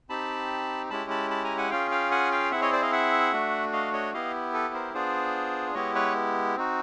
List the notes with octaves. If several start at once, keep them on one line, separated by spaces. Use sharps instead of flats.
C4 D#4 G4 A5 B5
G#3 C#4 E4 G4 A5 B5
A5 B5
A5 B5
G#5 A#5
F#5 G#5
C#4 F4 G#4 F5 G5
F5 G5
F#5 G#5
F5 G5
C4 E4 G#4 E5 F#5
C#5 D#5
C5 D5
D#5 F5
E5 F#5
A3 D4 F#4
D#5 F5
C#5 D#5
B3 E4 G4 D#5 F5
A4 B4
A#4 C5
B3 D4 F4 G#4 C5 D5
G#3 B3 E4 G4 C#5 D#5
B4 C#5
C4 D#4 F#4